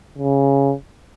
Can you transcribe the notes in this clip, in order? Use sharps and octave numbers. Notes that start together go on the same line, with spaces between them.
C#3